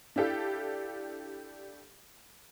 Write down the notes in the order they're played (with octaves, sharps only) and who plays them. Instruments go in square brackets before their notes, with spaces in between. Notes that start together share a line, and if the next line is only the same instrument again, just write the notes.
[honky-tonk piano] D4 E4 G4 A4 F5